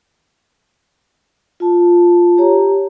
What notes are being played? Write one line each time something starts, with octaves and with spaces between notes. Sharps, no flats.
F4 A5
G4 C#5 A#5